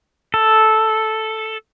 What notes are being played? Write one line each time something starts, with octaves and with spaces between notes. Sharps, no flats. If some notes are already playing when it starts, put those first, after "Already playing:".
A4